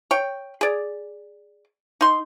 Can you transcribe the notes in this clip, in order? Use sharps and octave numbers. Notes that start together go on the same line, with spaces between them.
C#5 G5
G#4 D5
D#4 C6